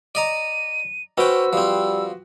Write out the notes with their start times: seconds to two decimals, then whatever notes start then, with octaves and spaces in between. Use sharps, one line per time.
0.15 D5 D#5 A#5 D#7
1.18 C#4 F#4 B4 C5 G5 E6
1.53 F3 G3 C4